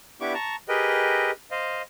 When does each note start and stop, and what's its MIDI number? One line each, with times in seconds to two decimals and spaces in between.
0.21 0.34 59
0.21 0.34 62
0.21 0.34 64
0.21 0.34 67
0.21 0.34 85
0.21 0.34 86
0.34 0.56 81
0.34 0.56 82
0.34 0.56 85
0.69 1.31 67
0.69 1.31 68
0.69 1.31 70
0.69 1.31 71
0.69 1.31 75
0.69 1.31 79
1.51 1.82 72
1.51 1.82 75
1.51 1.82 77